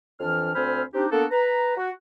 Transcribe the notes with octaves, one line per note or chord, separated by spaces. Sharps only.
F2 E3 D4 F6
D2 C4 C5 G#5 B5 F6
C4 D4 D#4 G4
A#3 B3 D4 F#4 A4
B4 A#5
F#4